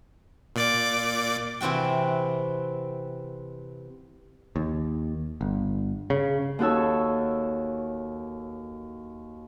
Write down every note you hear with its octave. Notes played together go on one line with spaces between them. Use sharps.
A#2 D5 D6
C3 E3 C4 F#4 G5
D#2
G1
C#3
D#2 D#4 F#4 A4 C#5 E6